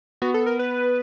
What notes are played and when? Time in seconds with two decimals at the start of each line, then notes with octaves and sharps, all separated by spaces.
0.22 B3 F#4
0.34 A4
0.46 A#4
0.59 B4